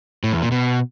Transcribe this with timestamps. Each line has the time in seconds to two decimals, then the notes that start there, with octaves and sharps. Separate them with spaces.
0.24 A2
0.33 E2
0.42 A#2
0.52 B2